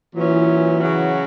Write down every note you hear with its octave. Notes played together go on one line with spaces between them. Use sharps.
A#2 E3 F#3 C#4
C#3 F#3 C#4 F#4